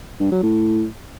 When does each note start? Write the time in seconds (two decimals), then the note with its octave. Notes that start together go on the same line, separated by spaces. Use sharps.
0.20 G2
0.31 F#3
0.43 A2